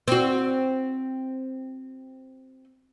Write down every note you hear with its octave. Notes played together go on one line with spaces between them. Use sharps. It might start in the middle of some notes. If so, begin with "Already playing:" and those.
C4 F#4